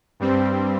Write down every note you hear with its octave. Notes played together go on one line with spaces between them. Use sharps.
G2 G3 C4